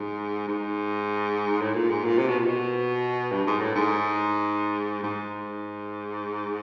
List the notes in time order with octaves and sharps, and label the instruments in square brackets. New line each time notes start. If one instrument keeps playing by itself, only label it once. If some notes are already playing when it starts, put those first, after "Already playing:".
Already playing: [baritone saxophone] G#2
G#2
A2
A#2
G#2
A#2
C3
B2
A#2
B2
G2
G#2
A2
G#2
G#2